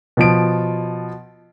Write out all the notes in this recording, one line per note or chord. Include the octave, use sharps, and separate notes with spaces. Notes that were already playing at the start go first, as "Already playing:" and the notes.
B2 F3 D7